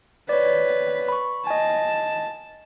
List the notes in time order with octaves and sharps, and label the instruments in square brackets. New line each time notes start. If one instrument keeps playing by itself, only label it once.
[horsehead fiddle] B4 [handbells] C#5 D5
[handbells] B5 C#6
[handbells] D#5 G#5 [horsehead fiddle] A5